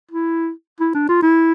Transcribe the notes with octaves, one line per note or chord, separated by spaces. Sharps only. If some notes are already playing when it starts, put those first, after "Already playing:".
E4
E4
D4
F4
E4